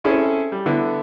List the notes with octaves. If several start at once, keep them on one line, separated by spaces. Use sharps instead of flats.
C4 C#4 E4 G#4 A4
G3
D3 B3 E4